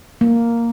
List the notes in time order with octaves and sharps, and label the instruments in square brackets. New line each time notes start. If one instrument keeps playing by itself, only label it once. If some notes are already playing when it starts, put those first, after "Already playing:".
[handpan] A#3